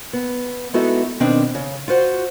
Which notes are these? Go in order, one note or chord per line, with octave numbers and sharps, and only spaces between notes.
B3
G#3 B3 D#4 E4 F#4 A4
B2 D#3 B3 C4 D4
C#3
F4 F#4 C5 F#5